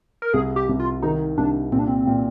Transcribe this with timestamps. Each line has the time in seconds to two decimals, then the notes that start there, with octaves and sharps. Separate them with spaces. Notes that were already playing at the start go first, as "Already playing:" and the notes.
0.22 A#4
0.34 C2 G#4
0.56 G4
0.69 C2
0.80 F4
1.03 D#3 D#4
1.38 C2 D4
1.72 A#2 C4
1.79 D4
1.87 C4
2.07 A#2